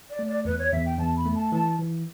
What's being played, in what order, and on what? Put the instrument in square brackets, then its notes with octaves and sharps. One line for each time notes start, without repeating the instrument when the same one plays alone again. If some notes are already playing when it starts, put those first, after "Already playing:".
[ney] D5
[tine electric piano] A3
[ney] D5
[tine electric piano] E2 [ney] B4
[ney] C#5
[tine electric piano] E2 [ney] E5
[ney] G5
[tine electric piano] E2 [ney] A5
[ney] B5
[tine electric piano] A3
[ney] A5
[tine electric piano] E3 [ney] A5
[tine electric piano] E3